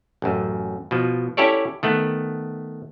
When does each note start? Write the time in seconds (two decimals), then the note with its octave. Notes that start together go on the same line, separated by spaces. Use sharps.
0.22 A1 F#2
0.91 B2 F3
1.37 C#4 E4 G4 A4 C#5 D5
1.83 D#3 A3 B3